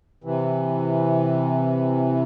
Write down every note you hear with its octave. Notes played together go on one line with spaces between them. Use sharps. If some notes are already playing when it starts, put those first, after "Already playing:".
C3 E3